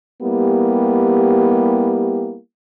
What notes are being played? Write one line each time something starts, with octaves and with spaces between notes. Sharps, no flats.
G3 A#3 B3 E4 G4